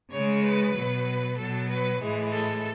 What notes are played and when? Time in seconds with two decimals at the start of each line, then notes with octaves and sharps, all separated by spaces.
0.12 C#3 G#3 C#5
0.44 B4
0.76 B2 F#3
1.38 B2 F#3 A4
1.70 B4
2.02 A2 E3 G#3
2.34 A4